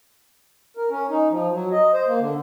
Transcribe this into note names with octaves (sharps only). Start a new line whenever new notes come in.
A#4
C#4
D#4
F3
F#3
D#5
C5
A#3
D3